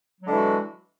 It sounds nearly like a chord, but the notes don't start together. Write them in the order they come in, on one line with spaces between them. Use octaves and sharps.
F#3 G#3 D3 E3 F#4